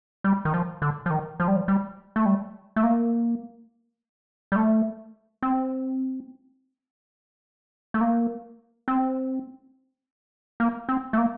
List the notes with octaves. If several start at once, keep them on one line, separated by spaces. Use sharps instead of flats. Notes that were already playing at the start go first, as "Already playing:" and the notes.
G3
D#3
F3
D3
F3
D#3
F3
G3
F3
G3
A3
G3
A3
A#3
G3
A3
C4
A3
A#3
C4
A#3
C4
A3
A#3